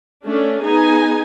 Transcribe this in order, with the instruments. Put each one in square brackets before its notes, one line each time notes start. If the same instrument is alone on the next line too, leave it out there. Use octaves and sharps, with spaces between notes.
[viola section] A3 C#4 D4 A4
B3 D#4 G#4 G#5